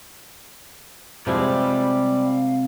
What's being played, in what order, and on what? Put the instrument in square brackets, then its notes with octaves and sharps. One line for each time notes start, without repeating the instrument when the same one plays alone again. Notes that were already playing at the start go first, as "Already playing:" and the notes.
[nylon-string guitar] C3 [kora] F3 G#3 E4 [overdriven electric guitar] D5 G5 [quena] B5
[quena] F5